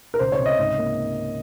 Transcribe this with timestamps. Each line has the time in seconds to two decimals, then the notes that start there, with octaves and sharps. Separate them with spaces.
0.14 A#4
0.19 C#2 C5
0.32 C#5
0.39 C3
0.46 D#5
0.58 G#2
0.78 A#3